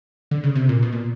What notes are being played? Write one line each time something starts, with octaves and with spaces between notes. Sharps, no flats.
D3
C#3
C3
A#2
B2
A#2